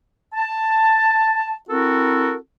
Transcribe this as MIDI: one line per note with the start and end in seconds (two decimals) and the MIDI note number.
0.33 1.55 81
1.69 2.36 60
1.69 2.36 64
1.69 2.36 66
1.69 2.36 69
1.69 2.36 70